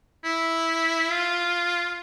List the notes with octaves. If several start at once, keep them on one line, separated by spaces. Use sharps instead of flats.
E4
F4